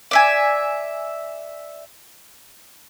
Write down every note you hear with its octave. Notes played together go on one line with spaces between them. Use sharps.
D5 E5 G#5